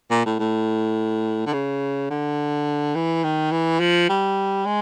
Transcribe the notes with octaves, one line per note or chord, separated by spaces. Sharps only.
A#2
A2
A2
D3
C#3
D3
E3
D#3
E3
F3
G3
G#3